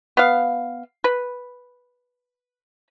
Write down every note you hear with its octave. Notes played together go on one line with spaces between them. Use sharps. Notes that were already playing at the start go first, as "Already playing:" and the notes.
B3 F5
B4